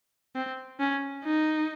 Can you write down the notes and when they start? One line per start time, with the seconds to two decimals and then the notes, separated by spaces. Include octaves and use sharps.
0.36 C4
0.80 C#4
1.24 D#4